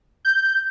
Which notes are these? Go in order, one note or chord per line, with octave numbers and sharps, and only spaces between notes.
G6